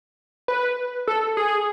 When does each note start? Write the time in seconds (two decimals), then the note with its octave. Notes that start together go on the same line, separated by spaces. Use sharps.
0.48 B4
1.08 A4
1.37 G#4